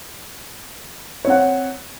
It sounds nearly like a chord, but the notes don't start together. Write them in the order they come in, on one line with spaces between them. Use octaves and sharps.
C#5 C4 F#5